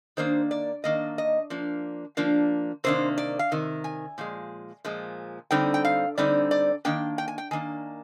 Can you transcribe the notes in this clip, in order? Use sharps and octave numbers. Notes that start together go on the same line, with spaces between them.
D#3 A#3 D4 C5
D5
D#3 A#3 D4 D#5
D#5
F3 A#3 D4
F3 A#3 D4
C3 D#3 A#3 D4 C5
D5
F5
C3 D#3
G#5
A#2 F3 G#3
A#2 F3 G#3
D3 G3 C4 D#4 G5
G5
F5
D3 G3 C4 D#4 D5
D5
D#3 A#3 D4 G5
G5
G#5
G5
D#3 A#3 D4 G#5